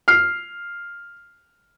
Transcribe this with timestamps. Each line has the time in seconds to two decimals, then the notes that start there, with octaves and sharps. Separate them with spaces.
0.08 F6 C7